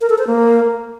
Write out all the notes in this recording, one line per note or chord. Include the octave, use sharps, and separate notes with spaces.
A#4
A4
C5
A#3